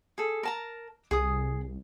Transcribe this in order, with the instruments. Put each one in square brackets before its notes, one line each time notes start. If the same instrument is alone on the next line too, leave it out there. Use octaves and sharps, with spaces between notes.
[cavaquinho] G#4 A4
A#4 A5 A#5
[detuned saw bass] C2 [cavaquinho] G#4 D#6